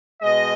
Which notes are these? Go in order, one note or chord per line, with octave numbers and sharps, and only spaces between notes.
B2 G#3 D#5